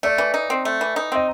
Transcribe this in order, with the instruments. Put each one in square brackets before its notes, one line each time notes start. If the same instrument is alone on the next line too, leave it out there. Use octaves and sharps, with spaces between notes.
[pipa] A3 [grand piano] D5
[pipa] E3
D#4
C4
A3
E3
D#4
[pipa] C4 [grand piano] D#5